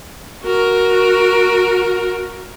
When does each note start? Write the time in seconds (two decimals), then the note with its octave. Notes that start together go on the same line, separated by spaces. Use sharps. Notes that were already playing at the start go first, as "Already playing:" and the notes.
0.44 F#4 A#4